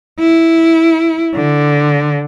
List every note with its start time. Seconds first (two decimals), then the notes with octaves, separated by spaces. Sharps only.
0.19 E4
1.35 D3